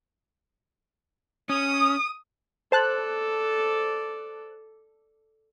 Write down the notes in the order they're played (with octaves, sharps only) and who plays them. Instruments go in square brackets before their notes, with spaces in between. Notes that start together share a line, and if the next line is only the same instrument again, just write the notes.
[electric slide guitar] C#4 [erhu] D#6
[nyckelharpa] A4 D5 [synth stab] C5 A5 F#6